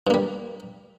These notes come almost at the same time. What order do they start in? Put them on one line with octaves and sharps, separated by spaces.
G2 A#3 G3